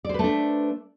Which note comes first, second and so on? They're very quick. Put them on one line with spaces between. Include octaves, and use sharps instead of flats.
D5 C5 B4 A3 D4